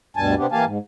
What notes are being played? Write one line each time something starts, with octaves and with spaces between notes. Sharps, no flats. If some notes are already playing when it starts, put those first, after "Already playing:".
D2 G2 B2 G3 G#5 A5
C3 B3 C4 D4 G4
E3 A#3 G4 F5 G#5 A5
G#2